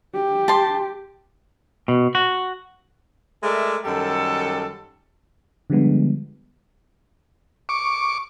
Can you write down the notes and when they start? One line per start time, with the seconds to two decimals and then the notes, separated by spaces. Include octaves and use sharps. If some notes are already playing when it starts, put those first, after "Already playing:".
0.14 G4
0.48 A5 C6
1.88 B2
2.15 F#4
3.43 G#3 A3 A#4 D5 E5
3.85 F#2 D#3 G3 A4
5.70 D3 F3 G3 G#3 B3
7.69 C#6 D6